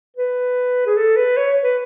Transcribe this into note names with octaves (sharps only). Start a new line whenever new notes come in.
B4
G#4
A4
B4
C#5
B4